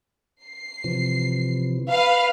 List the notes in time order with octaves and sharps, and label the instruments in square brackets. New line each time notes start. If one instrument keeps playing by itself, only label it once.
[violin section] C7
[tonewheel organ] C3 E3 F3
[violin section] B4 F5